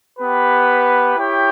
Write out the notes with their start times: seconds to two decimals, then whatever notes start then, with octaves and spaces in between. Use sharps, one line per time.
0.19 B3 G4 B4
1.17 E4 G4 C#5 G5